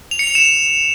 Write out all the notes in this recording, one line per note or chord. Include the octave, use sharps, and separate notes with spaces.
F7
C#7
F7
E7